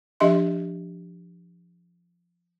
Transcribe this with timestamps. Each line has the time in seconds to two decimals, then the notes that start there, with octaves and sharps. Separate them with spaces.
0.20 F3 D4 G4 D#5 E5 C6